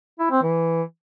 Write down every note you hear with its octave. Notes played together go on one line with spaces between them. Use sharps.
E4
C4
E3